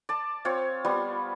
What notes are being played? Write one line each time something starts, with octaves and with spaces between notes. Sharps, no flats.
D5 A5
C4 F4 C#5
G3 B3 F4